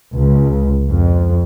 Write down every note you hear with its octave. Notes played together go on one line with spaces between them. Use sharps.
C#2
F2